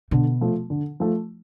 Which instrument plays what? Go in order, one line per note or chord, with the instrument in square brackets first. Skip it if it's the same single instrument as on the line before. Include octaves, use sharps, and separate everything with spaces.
[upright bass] B2 [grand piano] D3
[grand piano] F3 A3
D3
F3 A3